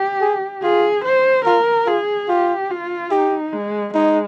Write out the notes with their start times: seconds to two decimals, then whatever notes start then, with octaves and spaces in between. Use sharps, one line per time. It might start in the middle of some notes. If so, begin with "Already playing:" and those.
Already playing: G4
0.21 G#4
0.62 F4 G#4
1.05 C5
1.45 F4 A#4
1.87 F4 G#4
2.29 F4 G4
2.71 F4
3.11 D#4 G4
3.53 G#3
3.94 G#3 D#4